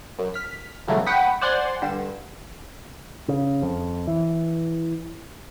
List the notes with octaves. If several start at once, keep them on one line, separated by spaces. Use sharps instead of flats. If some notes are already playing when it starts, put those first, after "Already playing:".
F#2
F6 B6
B1 C#3 E3 F#3 G3 A3
F#5 G5 B5 C#6 D#6 B6
C5 D5 F#5 G#5 C6
G2 D3 E7
C#3
F2
E3